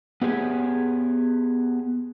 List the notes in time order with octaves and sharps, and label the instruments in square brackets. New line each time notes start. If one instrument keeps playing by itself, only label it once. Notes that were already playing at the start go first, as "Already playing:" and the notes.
[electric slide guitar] B3 G4 G#4